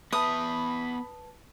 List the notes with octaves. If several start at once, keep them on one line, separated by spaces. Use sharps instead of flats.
B3 B4 E5 A5 B5 D#6